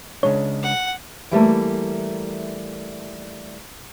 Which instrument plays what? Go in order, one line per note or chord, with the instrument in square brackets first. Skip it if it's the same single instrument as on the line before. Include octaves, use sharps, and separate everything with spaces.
[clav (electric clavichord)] C#3 G#3 D4 [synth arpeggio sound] C#5
[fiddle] F#5
[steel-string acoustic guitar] E3 G3 A3 A#3